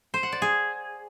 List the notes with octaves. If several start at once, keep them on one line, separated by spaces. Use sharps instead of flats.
C5
F#5
D5
G#4